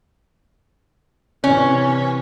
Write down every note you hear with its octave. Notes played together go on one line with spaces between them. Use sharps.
C3 E3 C#4